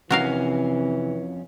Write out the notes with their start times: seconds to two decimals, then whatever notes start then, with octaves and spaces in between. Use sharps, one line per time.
0.10 F2 C3 E3 C#4 F#4 A#4 F5